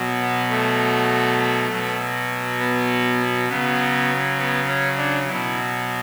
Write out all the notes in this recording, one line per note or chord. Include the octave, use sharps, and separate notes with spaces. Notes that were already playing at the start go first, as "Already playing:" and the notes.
Already playing: B2 F#3
B3
A3
B2 F#3
B3
C#3 F#3 B3
B3
C#4
D4
B2 F#3 E4